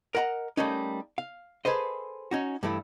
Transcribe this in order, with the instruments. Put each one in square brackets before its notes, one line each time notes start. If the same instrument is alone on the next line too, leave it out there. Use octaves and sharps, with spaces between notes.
[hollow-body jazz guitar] A#4 D#5 F#5 A5 A#5
G3 A3 A#3 C#4 D#4
F5
G#4 A4 B4 C5 D#5
C#4 D#4 F#4
G2 E3 A3 E4